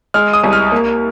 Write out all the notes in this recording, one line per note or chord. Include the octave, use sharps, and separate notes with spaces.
G#3 F6
D#6
C2
F6
A#3